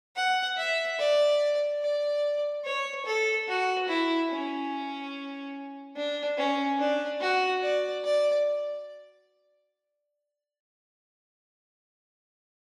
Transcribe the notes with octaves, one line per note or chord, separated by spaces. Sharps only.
F#5
E5
D5
D5
C#5
A4
F#4
E4
C#4
D4
C#4
D4
F#4
D5
D5